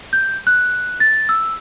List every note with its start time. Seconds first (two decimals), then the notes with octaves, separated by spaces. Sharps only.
0.13 G6
0.47 F#6
1.00 A6
1.29 E6